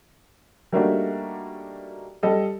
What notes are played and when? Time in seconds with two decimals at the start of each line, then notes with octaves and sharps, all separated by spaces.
0.73 G3 A3 A#3 D4 D#4 F#4
2.23 G3 A4 D#5